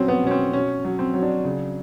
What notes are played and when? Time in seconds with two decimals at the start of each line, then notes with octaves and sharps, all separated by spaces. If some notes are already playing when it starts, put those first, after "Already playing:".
Already playing: B2 F#3 C4 C#4
0.08 B3
0.23 B2 C#4
0.31 C4
0.53 B2 C#4
0.85 F#3
0.99 C4
1.14 F#3
1.23 D4
1.45 C#3